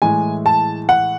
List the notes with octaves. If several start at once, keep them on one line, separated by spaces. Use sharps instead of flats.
A2 E3 G#3 G#5
A5
F#5